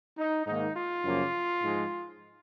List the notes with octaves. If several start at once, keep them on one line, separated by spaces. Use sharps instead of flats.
D#4
G#2 D#3 A#3 D#4
F4
F#2 C#3 F3 A#3
G#2 F3 G#3